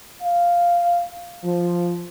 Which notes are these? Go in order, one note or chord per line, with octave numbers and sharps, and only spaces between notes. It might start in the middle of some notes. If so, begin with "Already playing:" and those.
F5
F3